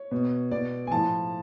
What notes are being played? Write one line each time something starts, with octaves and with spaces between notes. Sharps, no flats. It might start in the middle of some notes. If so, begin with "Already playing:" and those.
Already playing: C#5
B2
B2 D5
G#5
A2 F3 A5